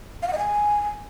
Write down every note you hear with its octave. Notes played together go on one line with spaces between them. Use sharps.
F5
F#5
D#5
G#5